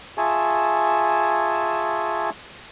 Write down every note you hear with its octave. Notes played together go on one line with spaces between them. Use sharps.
F4 G#4 E5 G#5 A5 C#6